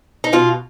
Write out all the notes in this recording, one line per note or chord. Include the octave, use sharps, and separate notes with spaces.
D#4
B2 F4